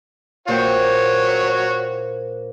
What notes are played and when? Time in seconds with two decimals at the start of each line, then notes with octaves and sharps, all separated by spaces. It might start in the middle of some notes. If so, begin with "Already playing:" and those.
0.48 A#2 F#4 C5 C#5 G5